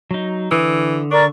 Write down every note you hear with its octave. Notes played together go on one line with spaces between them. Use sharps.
F#3 D#4
D3 E3 D#6 E6
D4 A#4 D5 C#6